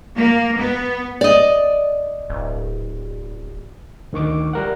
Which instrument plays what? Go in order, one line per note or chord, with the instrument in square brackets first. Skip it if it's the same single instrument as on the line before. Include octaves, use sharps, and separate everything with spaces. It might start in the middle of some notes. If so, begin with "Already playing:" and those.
[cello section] A#3
B3
[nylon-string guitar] D5 D#5
[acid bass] D1
[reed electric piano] D2 D#3 C#6 D6
G3 A#4 F#5